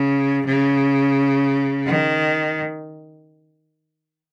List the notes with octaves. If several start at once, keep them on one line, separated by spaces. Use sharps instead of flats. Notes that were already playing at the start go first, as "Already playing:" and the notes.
Already playing: C#3
C#3
D#3